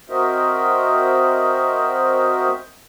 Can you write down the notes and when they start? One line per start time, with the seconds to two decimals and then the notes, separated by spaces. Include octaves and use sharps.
0.10 C4 F#4 A#4 C5 D#5 E5